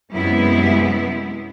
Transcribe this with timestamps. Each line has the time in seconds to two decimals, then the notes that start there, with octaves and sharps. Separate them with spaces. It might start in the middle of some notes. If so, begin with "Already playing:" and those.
0.13 F#2 C3 G#3 B3 E4